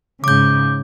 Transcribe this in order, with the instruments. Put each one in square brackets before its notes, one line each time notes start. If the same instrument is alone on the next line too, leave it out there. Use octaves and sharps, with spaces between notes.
[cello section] G#2 C#3 [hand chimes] D6 G6